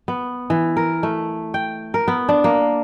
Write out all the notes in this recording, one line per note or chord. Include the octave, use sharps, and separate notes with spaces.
B3
E3
A#4
A3
G5
A#4
B3
D4
A#3